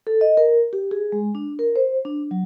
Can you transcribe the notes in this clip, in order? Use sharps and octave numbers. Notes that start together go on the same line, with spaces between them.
A4
D#5
A#4
G4
G#4
G#3
D4
A#4
C5
D4
F#3